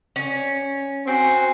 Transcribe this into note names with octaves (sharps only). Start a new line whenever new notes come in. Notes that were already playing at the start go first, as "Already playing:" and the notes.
C#4
C4 F#4 G#5